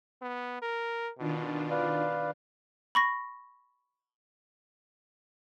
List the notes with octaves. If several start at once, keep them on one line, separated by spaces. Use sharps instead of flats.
B3
A#4
B2 D#3 D4 F4
B4 D5 F5
B5 C#6 A#6